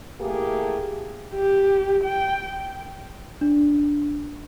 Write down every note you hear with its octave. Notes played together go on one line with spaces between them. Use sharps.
A3 A#3 E4 G4 G#4
G4
G5
D4